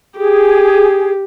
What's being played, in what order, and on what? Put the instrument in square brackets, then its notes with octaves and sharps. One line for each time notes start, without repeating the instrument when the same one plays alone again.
[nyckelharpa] G4 [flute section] G#4